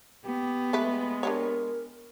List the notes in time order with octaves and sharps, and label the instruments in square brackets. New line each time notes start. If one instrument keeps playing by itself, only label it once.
[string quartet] B3 [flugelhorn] G4
[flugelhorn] G#3 [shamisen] A3 G4 B4
[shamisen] D4 G4 C#5 [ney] A#4